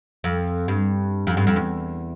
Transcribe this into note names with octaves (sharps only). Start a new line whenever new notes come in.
F2
G2
F2
G2
F2
E2